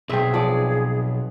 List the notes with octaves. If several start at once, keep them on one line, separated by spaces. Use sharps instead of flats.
B1 C4 G#4 E5
F3 D5